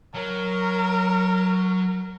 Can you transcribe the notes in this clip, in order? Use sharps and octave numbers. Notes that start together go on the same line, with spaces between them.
F#3 A#4